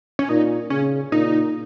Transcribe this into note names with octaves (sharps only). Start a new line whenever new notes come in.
C#4
A#2 D#4
C#3 C#4
A#2 D#4